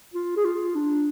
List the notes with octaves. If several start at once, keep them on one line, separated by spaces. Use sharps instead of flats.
F4
G#4
F4
D4